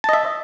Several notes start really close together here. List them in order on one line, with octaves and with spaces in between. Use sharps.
A5 D#5 E5